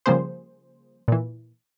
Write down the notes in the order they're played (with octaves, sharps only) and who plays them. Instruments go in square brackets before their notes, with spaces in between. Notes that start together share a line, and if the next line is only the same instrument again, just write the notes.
[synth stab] C#3 F3 G3 A#3 G#4 C5
A#2 E3